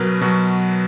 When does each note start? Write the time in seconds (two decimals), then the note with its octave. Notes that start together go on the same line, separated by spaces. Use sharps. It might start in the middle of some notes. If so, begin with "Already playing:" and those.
Already playing: B2 F#3 A#4 B4
0.21 B2 F#3 F#4